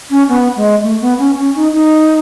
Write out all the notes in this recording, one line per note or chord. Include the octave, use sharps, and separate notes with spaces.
C#4
B3
G#3
A3
B3
C#4
C#4
D#4
D#4